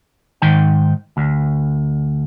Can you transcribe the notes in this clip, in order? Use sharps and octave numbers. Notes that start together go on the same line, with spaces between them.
G#2 D#3 G5
D2